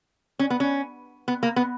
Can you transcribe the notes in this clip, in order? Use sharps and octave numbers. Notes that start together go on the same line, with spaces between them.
C#4
B3
C#4
B3
A#3
B3